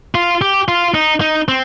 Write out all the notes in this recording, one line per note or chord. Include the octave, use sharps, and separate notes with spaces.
F4
G4
F4
D#4
D#4
C4